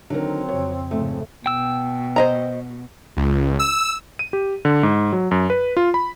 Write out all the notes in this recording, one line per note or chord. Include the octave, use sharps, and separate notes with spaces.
D3 D#3 F#3 C4 A#4
F2 C#3 C#5
F2 G#2 C#3 A3
B2 G5 E6
C5 D#5 A#5
C#2
E6
D#7
G4
D3
G#2
F#3
F#2
B4
F4
B5